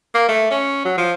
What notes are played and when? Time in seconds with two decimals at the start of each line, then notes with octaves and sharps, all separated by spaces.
0.15 A#3
0.29 A3
0.51 C#4
0.85 F#3
0.98 F3